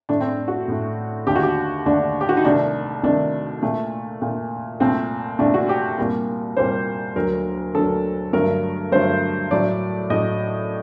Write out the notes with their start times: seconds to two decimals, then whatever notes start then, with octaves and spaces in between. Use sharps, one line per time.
0.09 A2 A3 D4
0.21 C4
0.28 D4
0.48 F#4
0.68 A2 A3
1.27 D#2 D3 A3 G4
1.36 F#4
1.43 G4
1.85 D#2 D3 A3 D4
2.21 G4
2.29 F#4
2.37 D#4
2.45 C2 C3 D#3 A3 D4
3.03 C2 C3 D#3 A3 D4
3.63 A#2 A3
4.22 A#2 A3
4.80 C2 A#2 A3 C4
5.39 C2 A#2 A3 D4
5.54 F#4
5.69 G4
5.98 C2 A#2 G3 A#3
6.57 C2 A#2 G3 A#3 C5
7.16 D2 D3 F#3 A#4
7.75 D2 D3 F#3 A4
8.33 G2 D3 F#3 A3 A#4
8.92 G2 D3 F#3 A3 C5
9.51 A2 F#3 A3 D5
10.10 A2 F#3 A3 D#5